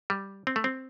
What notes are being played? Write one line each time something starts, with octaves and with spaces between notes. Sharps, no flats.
G3
C4
A3
C4